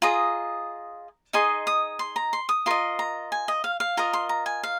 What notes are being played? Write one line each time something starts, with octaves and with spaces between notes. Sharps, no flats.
F4 G#4 D#5 A#5
D#4 G#4 D#5 C6
D#6
C6
A#5
C6
D#6
F4 A#4 D#5 C6
A#5
G#5
D#5
F5
F5
F4 A#4 D#5 A#5
C6
A#5
G#5
F5